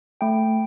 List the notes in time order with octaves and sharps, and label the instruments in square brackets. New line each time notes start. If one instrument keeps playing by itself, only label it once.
[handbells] A3 G5